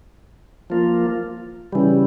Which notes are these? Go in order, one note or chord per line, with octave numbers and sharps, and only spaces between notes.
F3 A#3 F4
C#3 E3 G3